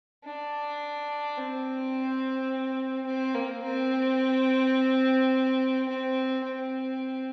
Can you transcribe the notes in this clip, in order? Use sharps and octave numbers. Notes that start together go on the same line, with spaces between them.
D4
C4
C4
A#3
C4
C4
C4